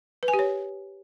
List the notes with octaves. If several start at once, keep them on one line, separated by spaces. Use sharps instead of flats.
B4
G#5
G4
C#5